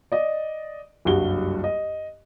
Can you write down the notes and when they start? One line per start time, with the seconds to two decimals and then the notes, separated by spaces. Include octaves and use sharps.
0.12 D5 D#5
1.05 F#1 C2 G2 F#4 G7
1.64 D#5